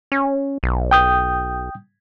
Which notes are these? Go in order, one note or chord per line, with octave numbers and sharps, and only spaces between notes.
C#4
B1
G5 D#6 G6